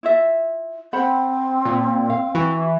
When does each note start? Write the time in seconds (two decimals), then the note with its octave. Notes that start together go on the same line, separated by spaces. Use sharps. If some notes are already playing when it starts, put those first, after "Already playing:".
0.03 E4 F4 E5
0.93 C4 C5 F#5 B5
1.65 A#2
2.10 F5
2.35 E3 F#4